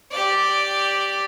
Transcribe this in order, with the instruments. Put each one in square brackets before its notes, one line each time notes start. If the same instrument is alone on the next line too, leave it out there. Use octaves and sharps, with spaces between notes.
[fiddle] G4 D5